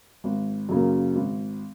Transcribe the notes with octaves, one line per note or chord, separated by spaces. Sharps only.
G#1
F#2 C#3 F#3 A#3
G#1